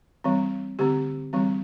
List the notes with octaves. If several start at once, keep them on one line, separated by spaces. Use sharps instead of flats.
E3 G3 C4
D3 A3 C4 G4
E3 G3 C4